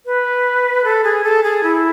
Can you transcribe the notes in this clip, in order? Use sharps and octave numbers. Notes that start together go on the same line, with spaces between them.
B4
A4
G#4
A4
G#4
E4